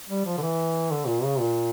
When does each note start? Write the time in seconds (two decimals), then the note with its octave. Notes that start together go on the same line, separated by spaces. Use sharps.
0.09 G3
0.25 F3
0.38 D3
0.42 E3
0.91 D3
1.07 A#2
1.23 C#3
1.40 A#2